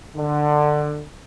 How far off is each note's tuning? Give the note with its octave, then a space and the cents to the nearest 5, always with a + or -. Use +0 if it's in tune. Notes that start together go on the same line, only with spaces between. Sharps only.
D3 +20